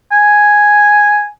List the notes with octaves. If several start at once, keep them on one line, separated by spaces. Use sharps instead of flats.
G#5